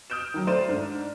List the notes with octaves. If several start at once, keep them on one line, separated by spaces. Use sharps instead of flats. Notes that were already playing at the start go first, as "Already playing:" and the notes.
D#6 F6 G6 D7 E7
D#3 F#3
A3 C5 D5 C6 D#7 E7
G#2 D4 F6